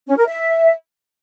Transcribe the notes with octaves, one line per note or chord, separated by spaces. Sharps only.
C#4
A#4
E5